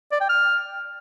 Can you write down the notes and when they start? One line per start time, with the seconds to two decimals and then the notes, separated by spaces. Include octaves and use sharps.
0.12 D5
0.21 G5
0.30 F6